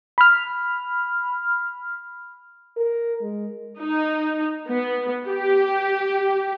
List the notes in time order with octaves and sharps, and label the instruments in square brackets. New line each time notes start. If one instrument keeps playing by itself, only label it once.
[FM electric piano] B5 F6
[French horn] A#4
G#3
[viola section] D#4
B3
G4